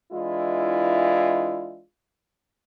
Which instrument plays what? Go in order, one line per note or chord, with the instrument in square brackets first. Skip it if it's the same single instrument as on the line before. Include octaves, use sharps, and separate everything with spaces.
[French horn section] E3 G#3 D4 E4 F4